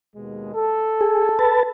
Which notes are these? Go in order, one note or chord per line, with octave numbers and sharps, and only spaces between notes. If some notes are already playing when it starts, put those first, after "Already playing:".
D#2 B2 G#3
A4
G#4
B4 A5